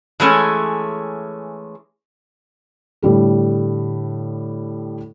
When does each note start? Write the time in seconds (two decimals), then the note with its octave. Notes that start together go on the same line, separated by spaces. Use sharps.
0.20 E3 G#3 A3 C#4
3.03 A2 D3 G3 A4